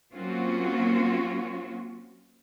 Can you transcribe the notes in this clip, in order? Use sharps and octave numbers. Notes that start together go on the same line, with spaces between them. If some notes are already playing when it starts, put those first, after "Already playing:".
F#3 A#3 C4 C#4 F4 F#4